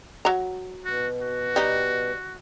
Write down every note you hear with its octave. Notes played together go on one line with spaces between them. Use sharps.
F#3 A#5
B2 F#4
F#4
G3 D#4